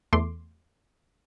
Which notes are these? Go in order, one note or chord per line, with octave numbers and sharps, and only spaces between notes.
E2 A3 C6 D6